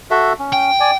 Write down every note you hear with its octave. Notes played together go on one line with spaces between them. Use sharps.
F#4 A4 E5
C#4
G5
D5 G#5